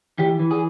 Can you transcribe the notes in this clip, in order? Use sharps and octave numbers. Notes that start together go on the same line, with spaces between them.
E3 G4
E3
G#4